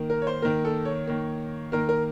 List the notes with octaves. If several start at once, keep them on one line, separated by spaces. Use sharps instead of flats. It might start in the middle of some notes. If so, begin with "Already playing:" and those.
Already playing: D#3 A#3
A#4
C#5
C5
D#3 A#3 A#4
A4
C#5
D#3 A#3
D#3 A#3 A#4
A#4